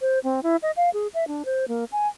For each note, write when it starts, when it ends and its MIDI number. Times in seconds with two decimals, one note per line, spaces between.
0.01 0.19 72
0.24 0.43 60
0.43 0.57 64
0.63 0.71 75
0.77 0.90 77
0.93 1.07 68
1.14 1.27 76
1.28 1.43 62
1.45 1.65 72
1.68 1.85 58
1.92 2.08 80